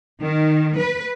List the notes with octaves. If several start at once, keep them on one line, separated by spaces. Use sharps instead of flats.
D#3
B4